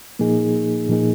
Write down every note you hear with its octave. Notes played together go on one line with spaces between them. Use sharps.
A#2 F3 A#3 D#4 G#4
A#2 F3 A#3 D#4 G#4